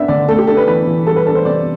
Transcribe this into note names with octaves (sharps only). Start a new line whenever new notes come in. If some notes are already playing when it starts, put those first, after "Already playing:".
Already playing: B3 D4 E5
D3 D5
A3 A4
G4
D4 A4
B4
E3 B4
E3
G3 A4
B4
D4 A4
C5
C3 D5